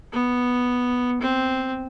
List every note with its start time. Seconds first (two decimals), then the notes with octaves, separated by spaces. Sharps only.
0.13 B3
1.21 C4